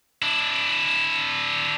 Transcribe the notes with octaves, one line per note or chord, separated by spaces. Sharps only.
D4 E4